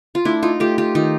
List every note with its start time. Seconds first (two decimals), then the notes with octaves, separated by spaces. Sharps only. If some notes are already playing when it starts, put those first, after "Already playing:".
0.15 F4
0.25 A3 D4 E4
0.43 D#4 F4
0.60 A3 F4 G4
0.78 F4 G4
0.95 D#3 D#4 F4